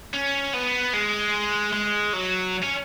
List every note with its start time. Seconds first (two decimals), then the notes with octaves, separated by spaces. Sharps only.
0.13 C#4
0.53 B3
0.93 G#3
1.73 G#3
2.13 F#3
2.63 C#4